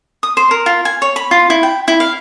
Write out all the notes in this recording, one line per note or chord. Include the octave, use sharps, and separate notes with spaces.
D#6
C5
A#4
F4
G#5
C#5
B5
F4
E4
G5
E4
F5